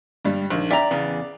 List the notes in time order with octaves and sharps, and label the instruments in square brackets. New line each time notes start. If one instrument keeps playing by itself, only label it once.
[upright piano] G2 G3
A#1 D#3
[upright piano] D5 [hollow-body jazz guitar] E5 G5 A#5
[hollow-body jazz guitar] E2 C#3 B3